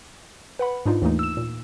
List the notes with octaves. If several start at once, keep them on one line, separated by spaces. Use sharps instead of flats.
B4 F#5 B5
G#2 D4 D#4 F4
D#2 E3 A3 A#3 D#4
E6 E7
A#2